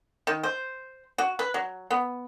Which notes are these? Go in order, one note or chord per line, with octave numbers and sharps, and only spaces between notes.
D#3
C5
F#4
B4
F#3
B3